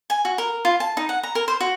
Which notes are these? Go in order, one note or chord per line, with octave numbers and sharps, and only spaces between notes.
G#5
F#4
A#4
F4
A5
D#4
F#5
A#5
A#4
C5
F#4